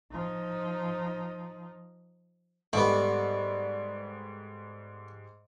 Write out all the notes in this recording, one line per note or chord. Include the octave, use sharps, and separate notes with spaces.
F3 D#4
G#2 G3 A3 B3 D5